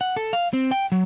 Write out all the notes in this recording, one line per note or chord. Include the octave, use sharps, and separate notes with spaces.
F#5
A4
F5
C4
G5
F#3